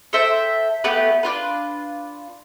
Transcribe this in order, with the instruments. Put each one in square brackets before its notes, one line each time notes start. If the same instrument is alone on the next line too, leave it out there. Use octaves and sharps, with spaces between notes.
[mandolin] A4 C5 E5 G5
A3 B3 G4 B4
D4 F4 B4